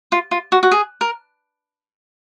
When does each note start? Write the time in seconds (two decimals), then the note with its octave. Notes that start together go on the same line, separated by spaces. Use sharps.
0.12 F4
0.31 F4
0.52 F#4
0.63 F#4
0.72 G#4
1.01 A#4